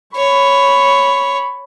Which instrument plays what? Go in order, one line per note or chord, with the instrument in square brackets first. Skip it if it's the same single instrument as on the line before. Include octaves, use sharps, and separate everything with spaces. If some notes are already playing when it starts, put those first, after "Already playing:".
[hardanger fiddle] C#5 [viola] B5 C#6